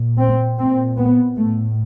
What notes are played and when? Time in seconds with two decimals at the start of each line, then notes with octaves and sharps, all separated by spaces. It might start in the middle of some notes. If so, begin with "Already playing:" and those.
Already playing: A#2
0.19 C4
0.58 A#2 C4
0.97 B3
1.36 A2 A3